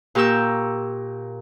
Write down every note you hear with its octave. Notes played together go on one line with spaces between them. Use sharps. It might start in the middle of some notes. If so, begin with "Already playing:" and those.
A#2 G4 A#4 C#6 E6 G6